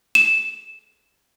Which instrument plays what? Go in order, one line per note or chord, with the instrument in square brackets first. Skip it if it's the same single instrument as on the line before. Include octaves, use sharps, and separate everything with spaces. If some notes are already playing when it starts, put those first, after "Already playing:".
[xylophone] E7